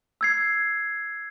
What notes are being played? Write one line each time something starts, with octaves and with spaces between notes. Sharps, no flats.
E6 G#6 C7